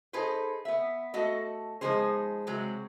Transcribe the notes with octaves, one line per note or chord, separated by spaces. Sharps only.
D#4 G#4 A4 B4 C5
B3 E5
A3 F#4 A4 D#5
F3 G#3 B3 D#4 G#4 C5
C3 F#3 G#3 C4